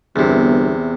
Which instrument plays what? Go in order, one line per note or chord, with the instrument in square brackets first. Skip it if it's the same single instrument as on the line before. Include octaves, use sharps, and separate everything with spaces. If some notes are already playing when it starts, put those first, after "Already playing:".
[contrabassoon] G1 [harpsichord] E2 C3